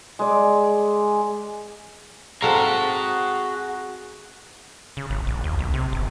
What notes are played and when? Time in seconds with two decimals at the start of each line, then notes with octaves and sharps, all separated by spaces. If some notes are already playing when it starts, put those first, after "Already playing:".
0.19 G#3 D5
2.42 C4 F#4 G#4 A4 F5 A#5
4.97 C#3
5.10 G#1
5.27 A#1
5.44 D#2
5.59 B1
5.74 C3
5.93 G1